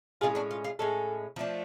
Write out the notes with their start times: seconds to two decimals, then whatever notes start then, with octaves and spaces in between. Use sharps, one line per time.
0.21 A2 G#3 C#4 F4 G#4
0.35 D4 F#4
0.51 F4
0.64 F4 G#4
0.79 A2 G#3 C#4 A4
1.36 F3 A3 D4